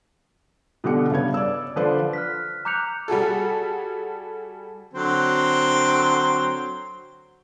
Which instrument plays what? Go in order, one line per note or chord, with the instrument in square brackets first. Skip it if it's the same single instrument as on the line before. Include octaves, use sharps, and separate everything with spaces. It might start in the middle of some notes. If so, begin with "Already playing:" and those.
[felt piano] B2 D3 G4 C#7
G2 C#3 B3 C#5 G#6
D5 E6
D3 F3 B4 C5 D5
[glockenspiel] F6 F#6 B6
A#5 D6 F#6 G6 C#7 F7
[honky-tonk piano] G3 F#4 G#4 A4
[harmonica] D3 F#3 C4